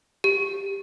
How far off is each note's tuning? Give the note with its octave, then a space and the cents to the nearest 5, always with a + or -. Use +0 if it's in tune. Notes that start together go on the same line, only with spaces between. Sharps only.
G4 +5